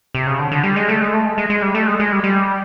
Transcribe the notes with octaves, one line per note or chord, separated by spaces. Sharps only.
C3
C#3
D3
D3
G3
G#3
A3
G#3
A3
G#3
G#3
G#3
G3
A3
G#3
G#3
G3
G3